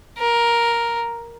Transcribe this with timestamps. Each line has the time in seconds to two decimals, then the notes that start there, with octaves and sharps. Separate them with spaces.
0.18 A#4